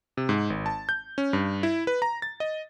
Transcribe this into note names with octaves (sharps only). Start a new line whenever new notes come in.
C3
G#2
G#1
A5
G6
C#4
G2
E4
B4
A#5
A6
D#5